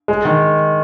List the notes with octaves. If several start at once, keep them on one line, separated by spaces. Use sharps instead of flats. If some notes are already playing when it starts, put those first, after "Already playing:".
G#3
D#3